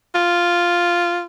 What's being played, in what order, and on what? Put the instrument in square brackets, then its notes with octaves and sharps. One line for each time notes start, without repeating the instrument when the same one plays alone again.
[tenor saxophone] F4